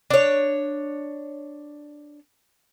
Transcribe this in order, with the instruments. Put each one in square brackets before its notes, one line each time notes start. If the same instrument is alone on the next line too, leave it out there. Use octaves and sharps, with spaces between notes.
[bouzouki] D4 C#5